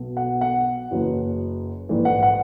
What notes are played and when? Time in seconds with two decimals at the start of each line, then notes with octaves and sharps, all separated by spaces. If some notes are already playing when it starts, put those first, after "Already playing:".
Already playing: B1 B2
0.17 F#5
0.41 F#5
0.91 F#1 F#2 E3
1.89 A#1 G#2 E3
2.05 F#5
2.23 F#5